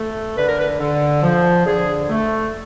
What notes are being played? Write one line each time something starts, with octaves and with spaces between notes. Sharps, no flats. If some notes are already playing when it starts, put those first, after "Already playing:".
Already playing: A3
D3 B4
A#4
B4
D3
F3
D3 G#4
A3